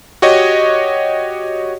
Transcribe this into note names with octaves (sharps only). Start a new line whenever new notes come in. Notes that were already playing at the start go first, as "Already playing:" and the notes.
F#4 G4 C#5 D#5